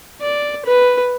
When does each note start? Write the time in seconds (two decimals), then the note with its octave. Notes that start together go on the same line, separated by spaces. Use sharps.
0.21 D5
0.65 B4